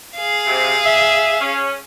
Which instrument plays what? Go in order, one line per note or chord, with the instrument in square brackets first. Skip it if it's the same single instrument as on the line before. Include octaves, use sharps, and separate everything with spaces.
[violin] G#4 F5
[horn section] C3
E5
C#4